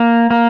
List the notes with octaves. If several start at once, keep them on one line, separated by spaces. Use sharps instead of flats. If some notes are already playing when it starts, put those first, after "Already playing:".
Already playing: A#3
A#3